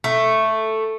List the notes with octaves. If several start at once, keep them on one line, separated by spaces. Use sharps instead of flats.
A3